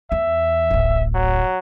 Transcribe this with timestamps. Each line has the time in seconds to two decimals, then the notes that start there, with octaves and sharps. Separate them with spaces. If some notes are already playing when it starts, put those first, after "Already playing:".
0.12 E2 E5
0.70 D1 A1
1.15 F#3